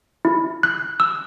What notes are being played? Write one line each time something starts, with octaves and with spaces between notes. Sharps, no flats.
E4
F#6
E6